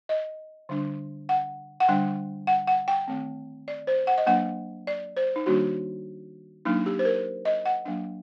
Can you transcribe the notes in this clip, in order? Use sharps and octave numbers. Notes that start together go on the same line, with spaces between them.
D#5
D3 G3 D4
F#5
F#5
D3 G3 D4 G5
F#5
F#5
G5
D#3 A3 C4
D5
C5
F#5
D#5
F#3 A#3 D4 F#5
D5
C5
D#4
D#3 G3 A#3 D4 F#4
F#3 A#3 D4 D#4
G4
C5
A#4
D#5
F#5
F#3 A#3 D4